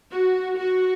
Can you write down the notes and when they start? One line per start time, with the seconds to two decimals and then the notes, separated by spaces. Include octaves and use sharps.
0.11 F#4
0.57 F#4